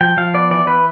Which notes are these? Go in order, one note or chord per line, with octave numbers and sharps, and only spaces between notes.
F3 G5
F3 F5
B3 D5
E3 D5
E3 B4